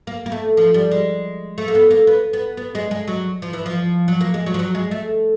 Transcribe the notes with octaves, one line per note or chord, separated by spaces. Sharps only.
A#3
A#3
A3
F3
G3
G#3
A3
A#3
B3
A#3
B3
B3
B3
G#3
G#3
F#3
F3
E3
F3
F#3
A#3
G#3
F#3
F3
F#3
G#3
A3